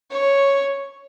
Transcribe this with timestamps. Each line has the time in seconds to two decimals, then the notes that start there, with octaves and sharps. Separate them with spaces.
0.11 C#5